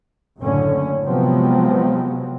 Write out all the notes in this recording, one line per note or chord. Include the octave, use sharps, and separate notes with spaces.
F#1 F#2 A2 D3 C#4
C3 F3 F#3 G#3 B3 C4